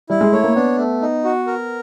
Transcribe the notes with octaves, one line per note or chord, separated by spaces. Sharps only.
G3 E4
G#3
A3 C#5
A#3
B3 D4
A3
D#4
F#4
A#4